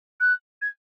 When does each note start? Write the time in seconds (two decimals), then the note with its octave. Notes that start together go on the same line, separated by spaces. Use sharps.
0.20 F#6
0.62 G#6